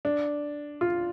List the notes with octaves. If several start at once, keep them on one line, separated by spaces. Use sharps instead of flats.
D4
F4